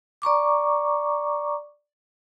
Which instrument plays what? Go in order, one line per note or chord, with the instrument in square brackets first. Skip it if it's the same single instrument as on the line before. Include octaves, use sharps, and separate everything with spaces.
[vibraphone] D5 A#5 C#6 D6